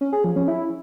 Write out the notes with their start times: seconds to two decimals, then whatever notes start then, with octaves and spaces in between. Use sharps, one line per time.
0.01 C#4
0.13 G#4
0.24 F3
0.36 C#4
0.48 E4